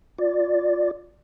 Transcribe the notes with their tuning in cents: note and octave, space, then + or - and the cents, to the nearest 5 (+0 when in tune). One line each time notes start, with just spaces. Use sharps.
F4 +15 D5 +0